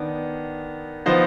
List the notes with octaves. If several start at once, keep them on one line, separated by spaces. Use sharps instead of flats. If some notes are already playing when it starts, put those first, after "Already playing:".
Already playing: D#3 B3 D4
F3 B3 D#4 C5